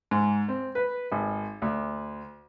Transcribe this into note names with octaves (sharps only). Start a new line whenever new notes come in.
G#2
C4
B4
G#1
D2